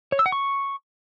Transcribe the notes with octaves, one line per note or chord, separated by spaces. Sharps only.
C#5
E6
F#5
C#6